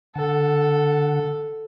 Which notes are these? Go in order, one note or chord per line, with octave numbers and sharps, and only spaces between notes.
D3 A4 F#5